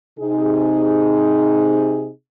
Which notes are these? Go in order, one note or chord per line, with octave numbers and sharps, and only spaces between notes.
C3 D#4 G#4